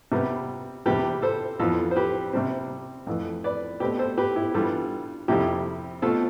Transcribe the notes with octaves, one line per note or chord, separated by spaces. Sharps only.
C3 G3 B3
E2 C3 G3 G4 B4
A4 C5
F2 E3 B3 F4 A4
C5
G4 B4
C3 G3 C4
F2 E3 A3
B4 D5
B2 A3 C4 G4 B4
A4 C5
G4 B4
E4 G4
G2 E3 G3 B3 F4 A4
F2 C3 G3 E4 G4
B2 A3 C4 F4 A4